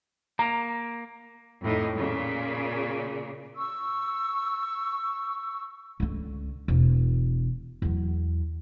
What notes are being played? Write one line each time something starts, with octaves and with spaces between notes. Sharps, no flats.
A#3 A#5
F2 A2 D#4
A#2 C#3
C#6 E6
C#2 D3
E1
E2 F#3